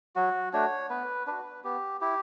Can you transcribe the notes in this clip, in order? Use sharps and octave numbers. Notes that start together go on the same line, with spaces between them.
F#3 F#4
A3 D4 F#4 C#5
B3 B4
D4 F#4 B4
B3 G4
E4 G4